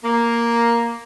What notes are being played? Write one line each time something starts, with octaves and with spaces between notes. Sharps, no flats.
A#3